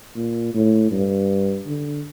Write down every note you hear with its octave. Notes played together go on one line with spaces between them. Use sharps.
A#2
A2
G2
D3